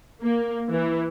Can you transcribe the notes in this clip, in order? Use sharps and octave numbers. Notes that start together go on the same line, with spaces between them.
A#3
E3